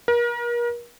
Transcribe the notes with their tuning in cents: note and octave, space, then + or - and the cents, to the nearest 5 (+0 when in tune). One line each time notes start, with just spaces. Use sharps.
A#4 +40